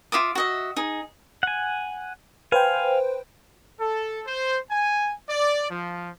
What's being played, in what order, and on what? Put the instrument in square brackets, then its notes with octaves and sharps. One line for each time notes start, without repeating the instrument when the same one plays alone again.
[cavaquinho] F4 E5 D6 D#6
F#4 D#5 E5
D#4 G#4
[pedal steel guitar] F#5 G#5
[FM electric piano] B4 C5 G5 [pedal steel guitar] F5 G#5
[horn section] A4
C5
G#5
D5
F3